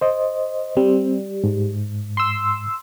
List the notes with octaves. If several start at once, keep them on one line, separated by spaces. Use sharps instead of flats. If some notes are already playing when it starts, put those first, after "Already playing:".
C5 D#5
G3 C4
G#2
C6 E6